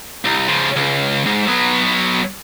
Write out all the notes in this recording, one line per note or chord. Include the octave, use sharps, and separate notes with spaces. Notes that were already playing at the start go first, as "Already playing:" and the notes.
C2
C#3 F3
C#2
G#2
F#3 B3